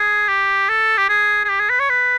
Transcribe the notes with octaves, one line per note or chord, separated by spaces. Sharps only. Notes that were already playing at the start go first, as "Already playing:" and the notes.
Already playing: G#4
G4
A4
G4
G#4
G#4
G4
G#4
B4
C#5
B4